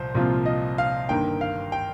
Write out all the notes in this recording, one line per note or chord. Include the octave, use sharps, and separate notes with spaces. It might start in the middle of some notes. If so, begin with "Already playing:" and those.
Already playing: C2 A#2 F3 C5
C2 A#2 F3 C4 F4
D#5
F5
G1 G2 D#3 A#3 G5
F5
G5